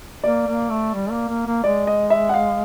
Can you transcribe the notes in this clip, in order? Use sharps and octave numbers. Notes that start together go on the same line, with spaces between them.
A#3 D5
A#3
A3
G3
A#3
A#3
A#3
G#3 D5
D#5
E5
F#5
F5